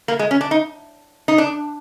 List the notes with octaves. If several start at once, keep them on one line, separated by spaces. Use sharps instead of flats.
A#3
G#3
C#4
D4
D#4
D#4
D4